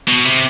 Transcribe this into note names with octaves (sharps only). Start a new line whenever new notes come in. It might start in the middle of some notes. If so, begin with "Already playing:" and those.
B2
C3